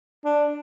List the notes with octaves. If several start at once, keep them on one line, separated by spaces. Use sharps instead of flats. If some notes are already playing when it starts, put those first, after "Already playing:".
D4